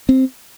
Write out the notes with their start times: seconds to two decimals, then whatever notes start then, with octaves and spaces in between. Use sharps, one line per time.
0.09 C4